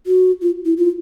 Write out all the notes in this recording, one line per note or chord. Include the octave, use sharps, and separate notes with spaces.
F#4
F4
E4
F4